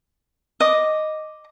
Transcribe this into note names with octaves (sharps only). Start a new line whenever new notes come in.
D#5 D6